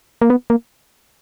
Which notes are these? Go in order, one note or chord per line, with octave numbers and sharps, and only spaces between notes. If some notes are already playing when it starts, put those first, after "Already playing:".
A#3
B3
A#3